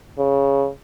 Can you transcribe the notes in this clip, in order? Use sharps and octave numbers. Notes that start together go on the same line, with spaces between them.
C#3